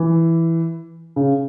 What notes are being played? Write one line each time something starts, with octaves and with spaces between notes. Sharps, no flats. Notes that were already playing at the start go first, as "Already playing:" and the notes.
Already playing: E3
C#3